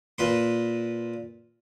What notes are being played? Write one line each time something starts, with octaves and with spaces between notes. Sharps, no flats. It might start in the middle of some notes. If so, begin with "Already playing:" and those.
A#2 B4 C6